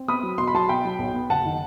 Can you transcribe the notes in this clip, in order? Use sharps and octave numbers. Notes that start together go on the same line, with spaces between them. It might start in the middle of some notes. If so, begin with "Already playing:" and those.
Already playing: C4
B3 B5 D#6
F#3
B2 C6
B5
F#3 A5 C6
B2 G5 B5
F#3
B1
B3
F#1 F#5 A5
D#3